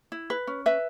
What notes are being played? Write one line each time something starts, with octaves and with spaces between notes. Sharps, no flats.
E4
B4
C#4
B4 E5